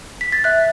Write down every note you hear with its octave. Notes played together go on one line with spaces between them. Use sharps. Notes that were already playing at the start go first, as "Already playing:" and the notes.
B6
A6
E5 F#6